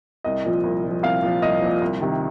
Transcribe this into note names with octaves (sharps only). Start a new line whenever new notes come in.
C2 D#5
A#2 F3
C2
A#2 F3
C2 F5
A#2 F3
C2 D#5
A#2 F3
C2
C3 D#3